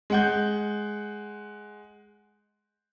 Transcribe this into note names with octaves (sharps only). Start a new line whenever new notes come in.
G#3 F#5 G6